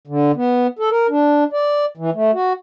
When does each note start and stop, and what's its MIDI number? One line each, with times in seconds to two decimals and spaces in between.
0.07 0.32 50
0.36 0.67 59
0.79 0.89 69
0.90 1.07 70
1.09 1.44 62
1.52 1.85 74
1.97 2.10 52
2.14 2.31 57
2.34 2.53 66